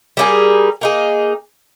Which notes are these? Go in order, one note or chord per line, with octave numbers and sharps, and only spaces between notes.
G3 A#3 D#4 G#4
A#3 D#4 G#4